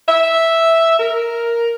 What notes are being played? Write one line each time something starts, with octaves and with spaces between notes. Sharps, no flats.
E5
A#4